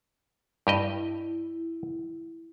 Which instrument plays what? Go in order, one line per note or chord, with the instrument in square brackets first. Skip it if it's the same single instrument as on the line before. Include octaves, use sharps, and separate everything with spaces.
[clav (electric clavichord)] G2 G4 D#5 [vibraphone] E4